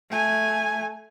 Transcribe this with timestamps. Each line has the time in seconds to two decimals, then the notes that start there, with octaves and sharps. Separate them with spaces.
0.10 A3 G#5